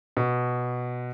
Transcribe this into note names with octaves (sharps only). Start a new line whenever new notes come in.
B2